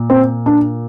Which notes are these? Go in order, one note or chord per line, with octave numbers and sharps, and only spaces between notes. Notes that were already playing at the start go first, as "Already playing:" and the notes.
Already playing: A#2
C4
D4